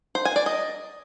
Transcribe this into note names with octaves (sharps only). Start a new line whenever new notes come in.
C5
G#5
D5
D#5